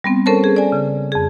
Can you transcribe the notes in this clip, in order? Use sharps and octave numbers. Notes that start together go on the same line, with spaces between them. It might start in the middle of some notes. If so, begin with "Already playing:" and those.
G3 B3 C4
C#4 A4 A#4 C5 C#5 A5
G#4
D5 G#5
C#3
F2 G#4